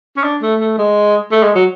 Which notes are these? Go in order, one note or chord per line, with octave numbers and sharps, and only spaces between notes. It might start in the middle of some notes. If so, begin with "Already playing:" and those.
C#4
D4
A3
A3
G#3
A3
G#3
F#3